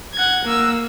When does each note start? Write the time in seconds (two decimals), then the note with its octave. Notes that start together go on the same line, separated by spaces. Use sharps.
0.14 F#5 G#6
0.45 A#3 E6